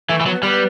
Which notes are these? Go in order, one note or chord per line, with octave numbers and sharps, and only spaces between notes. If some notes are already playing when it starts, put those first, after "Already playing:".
E3 A3
E3
F#3 B3
G3 B3